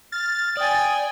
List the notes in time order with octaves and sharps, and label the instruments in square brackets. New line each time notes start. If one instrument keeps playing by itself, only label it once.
[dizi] F6 [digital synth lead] A6
[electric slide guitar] D5 [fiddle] G5 G#5 [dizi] D#6